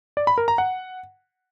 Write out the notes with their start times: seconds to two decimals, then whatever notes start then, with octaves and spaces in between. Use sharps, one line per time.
0.17 D5
0.27 B5
0.38 A#4
0.48 A#5
0.58 F#5